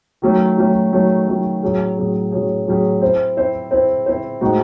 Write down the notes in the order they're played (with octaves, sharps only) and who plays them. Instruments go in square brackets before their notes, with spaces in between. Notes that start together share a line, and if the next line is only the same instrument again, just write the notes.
[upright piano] D#3 F#3 A3 C#4
D#3 F#3 A3 C#4
D#3 F#3 A3 C#4
D#3 F#3 A3 C#4
A2 F#3 C#4 G#4
A2 F#3 C#4 G#4
A2 F#3 C#4 G#4
A2 F#3 C#4 G#4
C4 E4 C5
C4 E4 C5
C4 E4 C5
C4 E4 C5
A2 G#3 C4 D#4 F#4